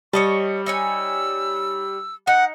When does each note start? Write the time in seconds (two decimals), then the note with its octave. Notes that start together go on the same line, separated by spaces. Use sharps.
0.13 G3 C#5 D#5 A5 C#6
0.66 D#4 C#5 G#5 E6
2.27 D#4 F#5